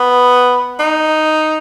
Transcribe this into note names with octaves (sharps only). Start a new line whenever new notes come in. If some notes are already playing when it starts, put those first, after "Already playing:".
Already playing: B3
D#4